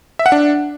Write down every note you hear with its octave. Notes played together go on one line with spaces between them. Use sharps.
E5
F#5
D4